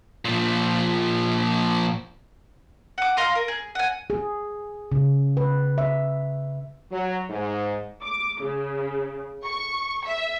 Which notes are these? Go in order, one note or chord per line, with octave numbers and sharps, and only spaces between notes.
A#2 F3
F#5 D6
D#5 F5 A#5 C6
A#4
G#4
F#5 G#5
G#4
C#3
B4
E5
F#3
G#2
D6
C#3
C#6
E5